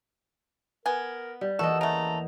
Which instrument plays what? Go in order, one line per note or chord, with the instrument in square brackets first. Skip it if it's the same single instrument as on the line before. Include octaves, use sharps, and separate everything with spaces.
[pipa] B3 G#5 [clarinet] A#4
[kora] G3
[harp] E2 E3 A#3 [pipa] F#4 [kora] A4 D#5 [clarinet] E6
[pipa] C#3 A3 [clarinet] A#5